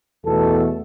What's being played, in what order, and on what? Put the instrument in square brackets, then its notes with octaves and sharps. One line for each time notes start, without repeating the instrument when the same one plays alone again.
[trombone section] E2 B2 A3 A4